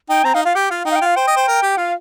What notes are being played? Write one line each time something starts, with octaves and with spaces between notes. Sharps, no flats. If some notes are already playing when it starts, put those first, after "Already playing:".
D#4 G5
C4 A#5
D#4 F5
F4 F5
G4 G5
F4 F5
D#4 G5
F5
G5
F4 F5
C5 G5
D#5
C5
A#4
G4
F4 F5